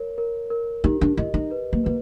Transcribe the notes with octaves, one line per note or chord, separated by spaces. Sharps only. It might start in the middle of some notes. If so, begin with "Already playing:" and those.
Already playing: A#4 C#5
A#4
A#4
D#4 G4
D4
E4 D#5
D#4
B4
A#3
A#3 B4